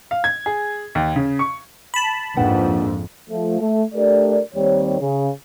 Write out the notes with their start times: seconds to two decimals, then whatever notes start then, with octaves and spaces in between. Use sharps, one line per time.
0.11 F5
0.24 G#6
0.46 G#4
0.95 D#2
1.16 C#3
1.39 C#6
1.94 A5 B5
2.37 A#1 F2 G#2 B4 F#5 G5
3.30 F3 A3
3.60 A3
3.94 A3 D4 G4 A#4 D5
4.55 D#2 D#3 G3 C4 C#5
5.00 C#3